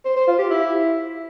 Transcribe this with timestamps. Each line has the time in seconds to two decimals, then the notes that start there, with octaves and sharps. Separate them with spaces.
0.05 C5
0.16 C5
0.28 F4
0.39 G4
0.50 E4